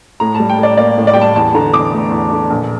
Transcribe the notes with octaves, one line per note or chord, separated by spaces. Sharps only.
A2 A#5
A5
G3
G5
A2 D5
A#3 D5
A2
D5
G5
G3
A5
E2 A5
D3 A#5
E2 D6
A3
E2
D3
A#1